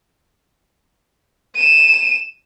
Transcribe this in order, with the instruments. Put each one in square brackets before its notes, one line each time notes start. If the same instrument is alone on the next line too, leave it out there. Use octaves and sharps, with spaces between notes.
[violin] D#7 E7